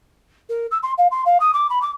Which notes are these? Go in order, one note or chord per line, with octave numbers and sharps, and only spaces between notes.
A#4
E6
C6
F5
C6
F5
D#6
D6
B5
D6